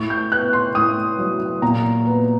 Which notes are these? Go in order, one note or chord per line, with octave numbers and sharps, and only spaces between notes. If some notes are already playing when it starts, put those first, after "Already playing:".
Already playing: A2 C#6
G6
B3 F#6
C6
A2 D#6
F#3
A#2 A#5
B3